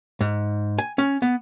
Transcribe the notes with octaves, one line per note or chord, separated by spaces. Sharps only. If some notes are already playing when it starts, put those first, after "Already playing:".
G#2
G#5
C#4
B3